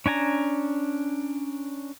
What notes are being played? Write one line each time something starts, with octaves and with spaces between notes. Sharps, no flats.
C#4 D4 G#5 A#5